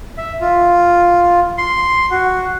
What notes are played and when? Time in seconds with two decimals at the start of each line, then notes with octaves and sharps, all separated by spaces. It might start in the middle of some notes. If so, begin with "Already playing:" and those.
0.18 E5
0.41 F4
1.58 C6
2.11 F#4